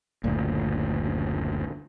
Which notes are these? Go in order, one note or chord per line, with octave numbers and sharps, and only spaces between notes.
F#1 D2 A#2